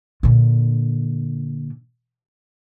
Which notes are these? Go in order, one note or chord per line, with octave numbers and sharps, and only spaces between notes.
A#2 D3